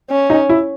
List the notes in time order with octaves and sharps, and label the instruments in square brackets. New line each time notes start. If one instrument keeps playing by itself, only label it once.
[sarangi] C#4
[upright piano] D#4
E4